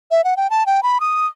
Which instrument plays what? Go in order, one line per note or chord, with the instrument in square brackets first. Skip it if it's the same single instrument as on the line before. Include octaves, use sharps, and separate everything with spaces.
[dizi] E5
F#5
G5
A5
G5
B5
D#6